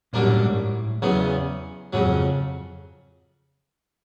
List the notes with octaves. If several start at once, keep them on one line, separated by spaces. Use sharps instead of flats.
F#2 A#2 D3 G3 A#3 D4
A2
G#2
A2
E2 C#3 F#3 B3
F2 G#2 C#3 F#3